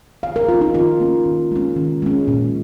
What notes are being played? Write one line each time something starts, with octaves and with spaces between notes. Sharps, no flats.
D#3 F5
A#4
A#3 C#4 F4
D#4
D#3 F4
A#3 C#4
D#3
G#3 C#4
D#3
G#3 C#4
A#2